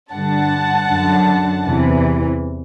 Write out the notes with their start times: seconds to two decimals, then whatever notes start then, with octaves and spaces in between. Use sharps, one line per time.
0.12 G2 D3 F#5 A5
0.89 F#2 D3
1.64 E2 C3 E3